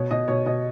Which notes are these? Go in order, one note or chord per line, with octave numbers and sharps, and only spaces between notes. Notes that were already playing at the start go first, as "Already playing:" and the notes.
Already playing: B2 C#5
B2 D#5
B2 C#5
B2 D#5